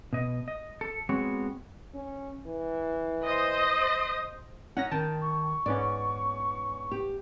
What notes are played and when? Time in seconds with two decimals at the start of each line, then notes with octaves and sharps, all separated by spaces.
0.13 B2 D#5
0.48 D#5
0.81 A4
1.09 G#3 B3 C4 F#4 C#5
1.94 C#4
2.47 E3
3.24 C5 D#5
4.77 C#4 D#4 C#5 F#5 A#6
4.91 D#3 G5 A5
5.21 C#6
5.66 G#2 B3 C#4 D5
6.91 G4